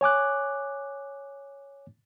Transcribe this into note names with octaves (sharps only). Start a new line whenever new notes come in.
C#5 G#5 D6 F#6